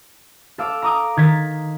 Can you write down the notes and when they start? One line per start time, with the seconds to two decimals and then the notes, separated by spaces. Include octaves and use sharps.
0.58 A4 F5 D6 E6
0.82 A#5 D6 D#6
1.17 D#3 G#6 A6 B6